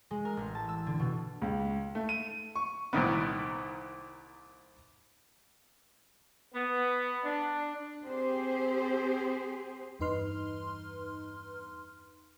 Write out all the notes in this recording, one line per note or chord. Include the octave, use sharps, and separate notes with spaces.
G#3
A#4
A1
A5
E6
D3
B2
C#2
A3
D#7
C#6
C2 A#2 D#3 B3
B3
D4
C4 G4 G#4 C5
E2 G2 D#4 B4 C6 F6